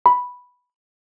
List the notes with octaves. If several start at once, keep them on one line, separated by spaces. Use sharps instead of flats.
B5